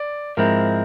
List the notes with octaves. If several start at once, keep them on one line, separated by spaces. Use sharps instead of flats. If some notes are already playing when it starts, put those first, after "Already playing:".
Already playing: D5
G#2 F3 G#3 C4 E4 A#4